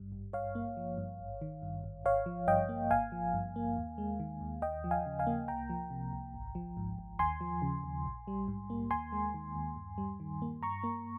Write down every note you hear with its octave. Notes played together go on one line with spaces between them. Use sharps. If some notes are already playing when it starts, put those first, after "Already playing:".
Already playing: G#1 G2 G3
G#1
G2 C#5 F5
A#3
F3
G2
G#1
D#3
G2
G#1
G#1 C#5 F5
F3
G2 D#5 G5
A#3
G#1 F5 G#5
F3
G2
A#3
D#2
G#3
D#3
D#2
D#2 D#5 G5
F3
F5 G#5
C#3
F5 G#5
A#3
C2 G5 A#5
F3
C3
C2
G#1
F3
G#2
G#1
D#2 G#5 C6
F3
C#3
D#2
A#1
G3
G#2
A#3
D#2 G#5 C6
G#3
D#3
D#2
G2
G3
D#3
A#3
G2 A#5 C#6
A#3